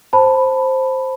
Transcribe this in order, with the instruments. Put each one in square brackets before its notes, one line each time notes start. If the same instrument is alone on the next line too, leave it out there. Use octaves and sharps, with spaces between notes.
[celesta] C5 A5 B5